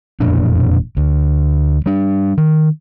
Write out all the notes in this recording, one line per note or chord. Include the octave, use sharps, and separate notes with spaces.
E1 F2 A#2 D4
D2
G3 D4
D#3